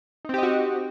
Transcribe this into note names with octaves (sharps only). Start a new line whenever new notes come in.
C4 D#4 F#4 G4 D#5